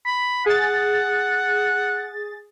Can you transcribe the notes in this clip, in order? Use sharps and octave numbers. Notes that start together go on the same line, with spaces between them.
B5
G#4 F#5 A6